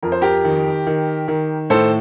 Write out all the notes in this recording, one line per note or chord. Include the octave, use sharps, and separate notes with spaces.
F2 A#4
C5
G4 A#4
D#3
D#3
D#3
A2 A4 C5